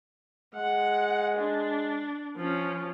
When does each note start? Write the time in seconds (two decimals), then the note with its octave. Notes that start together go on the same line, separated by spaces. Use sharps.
0.55 G#3 F#5
1.37 D4
2.37 F3 C#4